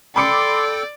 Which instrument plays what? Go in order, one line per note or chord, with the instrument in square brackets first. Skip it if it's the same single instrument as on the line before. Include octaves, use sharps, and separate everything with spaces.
[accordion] A4 G5 [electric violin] D5 [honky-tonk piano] B5 D6 C#7 [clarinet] C6